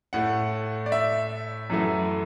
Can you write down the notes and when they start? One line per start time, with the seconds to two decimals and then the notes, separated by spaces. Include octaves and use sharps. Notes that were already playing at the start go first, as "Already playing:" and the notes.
0.13 A2 A3 F#5
0.86 D5
0.92 E5
1.70 F#2 E3 A3